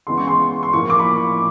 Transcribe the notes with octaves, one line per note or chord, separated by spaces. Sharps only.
C#3 E3 G#3 B3 C6
C#6
C6
C6
A2 F3 A#3 C#6
D6
B5